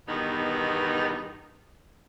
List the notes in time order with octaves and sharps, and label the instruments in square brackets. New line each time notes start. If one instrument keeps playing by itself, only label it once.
[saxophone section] E2 G2 B2 D#3 B3 D#4